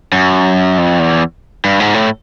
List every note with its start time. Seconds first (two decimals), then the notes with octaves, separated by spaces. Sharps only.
0.12 F#2
0.78 F2
0.99 E2
1.65 G2
1.80 G#2
1.94 A2